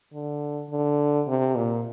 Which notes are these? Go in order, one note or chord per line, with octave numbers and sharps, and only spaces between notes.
D3
D3
C3
A#2